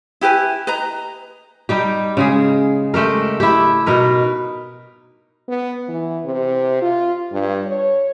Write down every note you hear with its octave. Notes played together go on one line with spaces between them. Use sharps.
E4 G4 B4 G#5
B4 D#5 A#5
G3 D#4 G4
C#3 G#3 G#4
G#3 A3 G4 A#4
E4 G4
B2 D#4 A#4 B4
B3
E3
C3
F4
G2
C#5